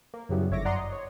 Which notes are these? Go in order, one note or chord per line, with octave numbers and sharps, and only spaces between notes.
A#3
F#2 C#3 F#3 G3 B3 E4
G1 C#5 E5 D6 A#6
F#2 D5 F#5 A#5 C6 D#6
D#5
C#5